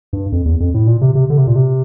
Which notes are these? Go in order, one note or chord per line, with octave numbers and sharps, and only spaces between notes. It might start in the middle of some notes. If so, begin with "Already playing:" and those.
G2
F2
E2
F2
A2
A#2
C3
C3
D3
C3
A#2
C3